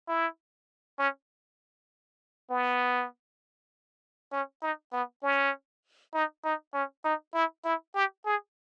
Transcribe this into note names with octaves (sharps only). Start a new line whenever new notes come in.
E4
C#4
B3
C#4
D#4
B3
C#4
D#4
D#4
C#4
D#4
E4
E4
G4
G#4